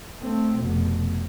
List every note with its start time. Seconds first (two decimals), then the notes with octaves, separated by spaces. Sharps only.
0.20 A3 C4
0.58 F1 B2